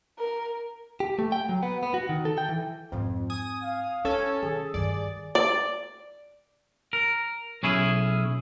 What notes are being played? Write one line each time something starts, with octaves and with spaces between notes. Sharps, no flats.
A#4
G4
A3
G5
F#3
B3
B3
F#4
D#3
A4
G5
E3
F2 G#2 C4
G#5 D#6
F5
C#4 E4 A4 C#5
D#3 G#4
G2 D#3 D5
D5
A#4
B1 C#4 E4 G#4